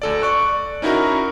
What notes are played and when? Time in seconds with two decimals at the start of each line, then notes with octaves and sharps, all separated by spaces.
0.02 D2 A4 D5
0.22 D5 C#6 F#6
0.82 C#4 D#4 E4 F#4 A#4